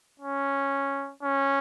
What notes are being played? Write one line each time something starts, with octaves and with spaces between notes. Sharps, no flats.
C#4
C#4